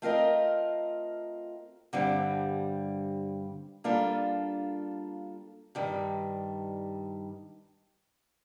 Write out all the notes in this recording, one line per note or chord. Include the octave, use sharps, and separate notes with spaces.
A3 C4 F4 A#4 D#5
G2 D3 G3 C4
G3 A#3 D4 F4 A4
G2 D#3 G3